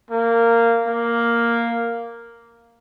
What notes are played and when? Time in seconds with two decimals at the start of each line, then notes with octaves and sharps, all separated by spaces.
0.11 A#3
0.87 A#3